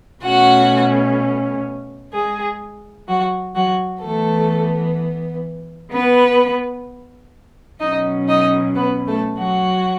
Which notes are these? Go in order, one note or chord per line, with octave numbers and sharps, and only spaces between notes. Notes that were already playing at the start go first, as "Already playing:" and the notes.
B2 A3 C#4 F#4 F#5
G#3 G#4
F#3 F#4
F#3 F#4
E3 A3 B3 A4
B3 B4
B2 F#3 C#4 D#4 D#5
D#4 D#5
B3 B4
A3 A4
F#3 F#4